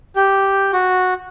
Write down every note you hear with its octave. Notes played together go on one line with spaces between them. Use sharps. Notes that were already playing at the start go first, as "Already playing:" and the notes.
G4
F#4